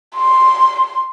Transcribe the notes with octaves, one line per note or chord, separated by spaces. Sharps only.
C6